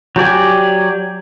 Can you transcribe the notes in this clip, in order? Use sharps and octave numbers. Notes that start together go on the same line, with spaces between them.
F#3 G4 D5 G#5